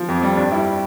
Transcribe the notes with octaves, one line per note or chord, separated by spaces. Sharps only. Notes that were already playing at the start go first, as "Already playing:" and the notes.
Already playing: F3
F2
G3
G2 D4
G3 E4